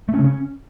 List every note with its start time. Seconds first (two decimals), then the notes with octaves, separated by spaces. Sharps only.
0.09 A3
0.14 C#4
0.19 C#3
0.24 C#4